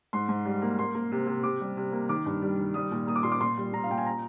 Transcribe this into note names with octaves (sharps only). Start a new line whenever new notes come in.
G#2 C6
G#2
G3
A#3
A#3 C6
A#3
C3
C3
C3 D6
G3
C3
A#3
D#3 D6
G2
G3
D#3
G3 D#6
A#2
A#3 D#6
D6
A#2 C6
D6
A#2 C6
G3
A#2 A#5
F5
A#2 G5
G#5
A#5